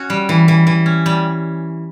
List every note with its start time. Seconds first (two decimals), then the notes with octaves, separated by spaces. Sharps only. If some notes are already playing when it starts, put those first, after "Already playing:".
Already playing: C#4 F#4
0.10 G3
0.29 E3
0.48 E3
0.67 E3
0.86 C#4
1.06 G3